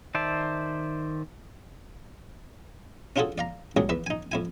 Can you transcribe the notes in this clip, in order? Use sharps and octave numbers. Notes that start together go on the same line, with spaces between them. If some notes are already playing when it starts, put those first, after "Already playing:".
D#3 C5 D5 E5 A5
C#4 D4 F4 F#4 G#4 A4
D5 F5 A#5
C2 F#2 F#3 G#4 D5
E2 B4 E5
D#4 G#5
F2 E4 G#5